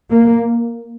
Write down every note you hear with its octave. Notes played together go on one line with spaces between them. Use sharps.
A#3